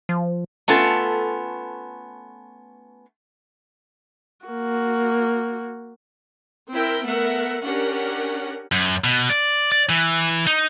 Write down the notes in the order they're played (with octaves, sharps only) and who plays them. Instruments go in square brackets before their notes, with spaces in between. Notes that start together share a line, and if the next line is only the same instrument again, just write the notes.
[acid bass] F3
[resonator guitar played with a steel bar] A3 B3 C#4 F4 A4
[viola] A#3 F#4
[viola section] C4 E4 A#4 G5
A3 B3 A#4 E5 F#5
C#4 D4 G4 A#4 F#5
[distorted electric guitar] F#2
B2
D5
D5
E3
D#4